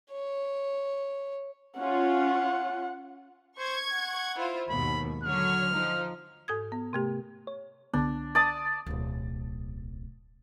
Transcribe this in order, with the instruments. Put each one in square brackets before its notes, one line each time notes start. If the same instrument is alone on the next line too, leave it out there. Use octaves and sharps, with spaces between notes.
[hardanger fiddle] C#5
[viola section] C#4 F4 [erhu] F#5
[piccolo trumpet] C5 [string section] C#6 G#6
[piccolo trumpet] F#5
[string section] E4 F4 C5
[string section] D#2 G#2 B2 [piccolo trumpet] B5
[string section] D3 F#3 C#5 [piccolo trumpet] F6
[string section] F3 D#4
[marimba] G#2 A4 D#6 G#6
B3
C3 A3 G4
[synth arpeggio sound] C#5
[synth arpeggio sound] C2 D3 B3 [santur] D4
[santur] D5 A5 D#6
[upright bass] D1 B1